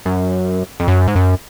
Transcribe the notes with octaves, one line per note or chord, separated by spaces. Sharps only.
F#2
F2
F#2
G#2
F#2